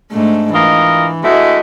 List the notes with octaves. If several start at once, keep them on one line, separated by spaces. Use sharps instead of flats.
G#2 A3 D4
E3 F4 A#4 D#5
G#3 A3 E4 F#4 D#5